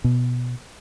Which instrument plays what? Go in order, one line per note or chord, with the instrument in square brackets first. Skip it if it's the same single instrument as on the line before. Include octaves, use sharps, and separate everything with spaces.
[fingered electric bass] B2